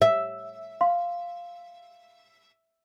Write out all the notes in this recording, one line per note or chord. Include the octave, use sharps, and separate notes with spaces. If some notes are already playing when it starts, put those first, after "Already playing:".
E5
F5 C6